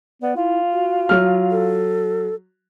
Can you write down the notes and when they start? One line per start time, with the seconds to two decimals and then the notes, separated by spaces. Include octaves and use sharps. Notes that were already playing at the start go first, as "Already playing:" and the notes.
0.22 B3 D5
0.36 E4 F4
0.72 F#4
1.09 F#3 F6
1.51 A4